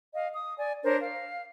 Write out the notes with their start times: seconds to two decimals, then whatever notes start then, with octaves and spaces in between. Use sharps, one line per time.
0.14 D#5 F5
0.33 D#6
0.58 D5 G#5
0.83 D4 A#4 C5 C#5
1.01 F5